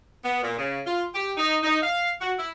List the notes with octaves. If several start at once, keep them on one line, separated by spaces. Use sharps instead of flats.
B3
A#2
C#3
F4
G4
D#4
D#4
F5
F#4
E4